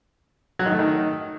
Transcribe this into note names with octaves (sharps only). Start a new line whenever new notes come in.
F#3
D#3
A3
D#3